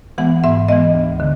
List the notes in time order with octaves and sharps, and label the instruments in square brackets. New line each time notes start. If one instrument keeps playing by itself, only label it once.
[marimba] E3 G#3 B3 F#5
G#2 E5
E3 G#3 B3 D#5
D2
D3